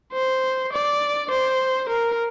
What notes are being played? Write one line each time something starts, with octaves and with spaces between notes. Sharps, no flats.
C5
D5
C5
A#4